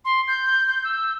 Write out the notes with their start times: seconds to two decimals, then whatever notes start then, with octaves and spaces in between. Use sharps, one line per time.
0.05 C6
0.28 G6
0.68 G6
0.84 E6